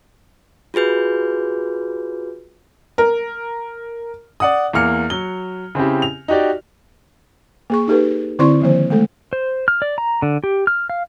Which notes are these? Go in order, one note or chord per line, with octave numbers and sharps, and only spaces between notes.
F4 F#4 G#4 B4 G6
A#4
D5 F#5 D#6
E2 A#3 F6 C#7
F#3 G7
C#3 C4 E4 G4
F7
D#4 F#4 G4 D5
A#3 G#4 C#6
D#4 G4 A4 B4
D3 C4 E4 D5 C6 C#6
D#3 F3 A#3 C5
G#3 A3 A4
C5
F6
D5
A#5
D3
G4
F6
F5